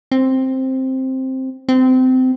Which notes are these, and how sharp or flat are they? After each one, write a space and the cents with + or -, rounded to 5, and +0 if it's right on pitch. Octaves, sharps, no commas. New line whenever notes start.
C4 +5
C4 -25